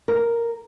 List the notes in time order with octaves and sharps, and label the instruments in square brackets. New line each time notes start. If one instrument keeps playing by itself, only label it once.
[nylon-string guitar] A#4